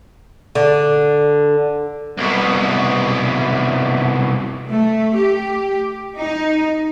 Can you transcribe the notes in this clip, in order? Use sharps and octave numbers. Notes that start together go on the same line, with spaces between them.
D3
C2 B2
A3
G4
D#4